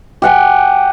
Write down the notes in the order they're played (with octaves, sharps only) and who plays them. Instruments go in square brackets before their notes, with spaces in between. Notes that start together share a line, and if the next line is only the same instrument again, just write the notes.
[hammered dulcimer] G4 F#5 G#5